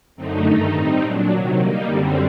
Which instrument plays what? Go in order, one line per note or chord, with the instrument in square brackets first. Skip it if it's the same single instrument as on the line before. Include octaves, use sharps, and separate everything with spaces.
[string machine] F#2 D3 A3 C4 D#4
G2 D#3 A3 D#4
A2 G3 C4 D#4
A#2 F#3 A3 D4
C3 D#3 F#3
D3 G3 A#3 D#4
F#2 D3 G3 C4